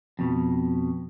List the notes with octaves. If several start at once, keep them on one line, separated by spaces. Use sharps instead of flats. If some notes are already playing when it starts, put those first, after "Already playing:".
F2 B2